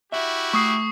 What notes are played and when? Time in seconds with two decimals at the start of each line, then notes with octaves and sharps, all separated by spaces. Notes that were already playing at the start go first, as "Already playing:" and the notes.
0.12 E4 F#4 G4 E5
0.53 A3 C#6 D#6 C7